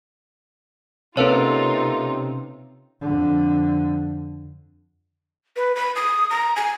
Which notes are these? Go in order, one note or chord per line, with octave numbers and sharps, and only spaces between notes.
C3 A#3 C#4 D#4 F4 A4 B4 C#5
F2 D3
B4
B5
D#6
A#5
G#5